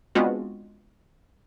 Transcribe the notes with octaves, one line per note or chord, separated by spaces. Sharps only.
G#3 B3 C4 D4 F4 F#4